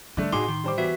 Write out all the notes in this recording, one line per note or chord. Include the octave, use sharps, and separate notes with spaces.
D3 G3 A3
A2 D#4 F#4 G#4 C6 D6
D#3
G3 C5 D6
E2 F#4 B4 E5